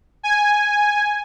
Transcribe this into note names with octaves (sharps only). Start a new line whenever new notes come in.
G#5